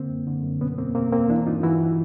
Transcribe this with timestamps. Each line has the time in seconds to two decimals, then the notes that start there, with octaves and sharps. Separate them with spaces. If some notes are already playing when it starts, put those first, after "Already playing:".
Already playing: D3 A#3 C4
0.10 F#2
0.27 D3
0.43 F#2
0.61 B2 B3 C#4
0.78 E2 A#3 C4
0.95 B2 A#3 C4
1.12 E2 A#3 C4
1.30 E3 D4 E4
1.46 G2 D#4 F4
1.63 E3 E4 F#4